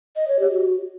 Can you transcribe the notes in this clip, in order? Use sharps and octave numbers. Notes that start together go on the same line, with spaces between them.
D#5
C#5
G4
F#4